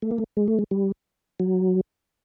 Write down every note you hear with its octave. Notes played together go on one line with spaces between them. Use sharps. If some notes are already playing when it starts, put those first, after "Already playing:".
A3
A#3
A3
G#3
A3
G#3
G3
F#3